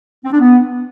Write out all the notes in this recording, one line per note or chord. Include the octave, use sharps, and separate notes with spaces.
C4
D4
B3